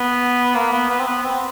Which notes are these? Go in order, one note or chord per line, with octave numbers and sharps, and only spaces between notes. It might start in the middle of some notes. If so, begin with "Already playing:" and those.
Already playing: B3
A#3
B3
B3
C4
B3
C4